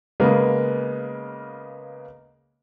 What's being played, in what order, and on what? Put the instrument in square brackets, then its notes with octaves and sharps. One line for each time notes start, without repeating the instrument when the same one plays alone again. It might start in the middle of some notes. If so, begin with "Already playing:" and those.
[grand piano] C#3 G#3 A#3 B3